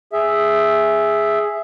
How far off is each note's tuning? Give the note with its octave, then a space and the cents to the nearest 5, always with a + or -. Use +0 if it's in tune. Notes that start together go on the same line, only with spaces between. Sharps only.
G#4 +0 E5 +0